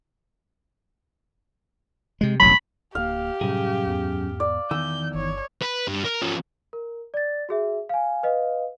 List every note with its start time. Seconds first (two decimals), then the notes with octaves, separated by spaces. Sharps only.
2.21 C3 G#3
2.40 E1 A1 F#3 B5
2.95 D1 A#3 G4 F5
3.41 F#2 A2 C3 G3 G#4
3.87 E2 G#2 B3
4.40 D5
4.71 E2 D#3 E3 E6 G6
5.15 G1 C#5
5.62 B4
5.88 G2
6.04 A#4
6.22 F3 C#4
6.73 A#4
7.14 D5 A6
7.49 F#4 G#4 E5
7.89 F5 G#5
8.23 B4 D#5 F5